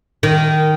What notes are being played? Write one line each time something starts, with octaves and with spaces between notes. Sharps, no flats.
D#3